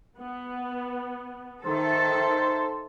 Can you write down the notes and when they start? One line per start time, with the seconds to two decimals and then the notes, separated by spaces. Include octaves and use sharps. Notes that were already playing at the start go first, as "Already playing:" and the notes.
0.17 B3
1.65 D#3 A4 C5 E5